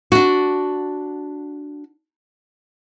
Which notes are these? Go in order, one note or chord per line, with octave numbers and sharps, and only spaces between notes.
D4 F#4